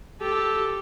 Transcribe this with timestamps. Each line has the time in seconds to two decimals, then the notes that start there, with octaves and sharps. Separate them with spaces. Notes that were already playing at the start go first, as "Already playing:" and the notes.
0.21 G4 A4